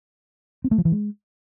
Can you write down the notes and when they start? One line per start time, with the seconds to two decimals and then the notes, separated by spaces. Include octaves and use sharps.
0.64 C4
0.71 A3
0.78 F3
0.85 E3
0.92 G#3